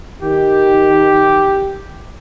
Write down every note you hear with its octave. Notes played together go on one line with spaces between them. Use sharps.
D#3 G4